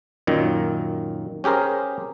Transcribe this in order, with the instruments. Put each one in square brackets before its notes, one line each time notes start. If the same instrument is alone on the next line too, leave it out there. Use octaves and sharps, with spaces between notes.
[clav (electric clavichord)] F#2 A#2 D#3
C#4 G4 G#4 A#4 C5